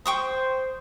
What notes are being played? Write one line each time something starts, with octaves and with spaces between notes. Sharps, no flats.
C5 G5 C#6 D#6